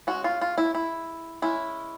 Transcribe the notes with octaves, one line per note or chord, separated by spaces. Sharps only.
G#3 C#4 F#4
F4
F4
E4
E4
G#3 C#4 E4